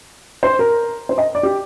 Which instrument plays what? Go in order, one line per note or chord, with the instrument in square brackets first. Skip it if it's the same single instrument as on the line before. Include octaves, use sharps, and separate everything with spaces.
[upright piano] C5
A#4
C5
D#5
D5
G4